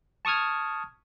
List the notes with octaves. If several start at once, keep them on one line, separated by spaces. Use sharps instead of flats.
A5 C#6 D#6 F6 G#6